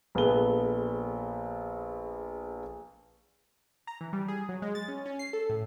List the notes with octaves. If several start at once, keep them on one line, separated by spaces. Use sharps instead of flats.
A#1 B3 G#4 A4 B4 G7
A#5
E3
G3
G#4
F#3
G#3
A6
C#4
C#4
C7
A4
A2